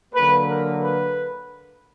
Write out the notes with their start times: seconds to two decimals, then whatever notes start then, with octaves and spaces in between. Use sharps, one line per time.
0.15 D3 F#3 A#3 B4
0.48 A#4
0.82 B4